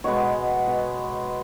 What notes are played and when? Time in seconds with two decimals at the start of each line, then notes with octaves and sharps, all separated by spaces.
0.04 B2 G#3 B3 C#5
0.67 B2 G#3 B3